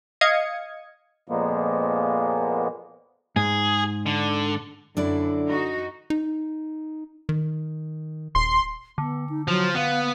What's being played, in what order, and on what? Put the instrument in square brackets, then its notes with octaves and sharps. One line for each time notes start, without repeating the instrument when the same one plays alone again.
[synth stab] D#5 F5 D#6 G#6 C#7
[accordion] F2 A#2 F3 G#3 A#3 B3
[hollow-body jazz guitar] G#2 [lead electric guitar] G#4
[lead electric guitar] D3
[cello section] F#2 [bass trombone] D3 [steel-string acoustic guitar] D4 E4 D5
[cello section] D#4 F#4
[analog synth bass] D#4
D#3
[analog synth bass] D#1 [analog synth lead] C6
[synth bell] D3 [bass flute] B3
[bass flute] D#4
[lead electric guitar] F3 [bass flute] F#3
[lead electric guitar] B3 [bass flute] F5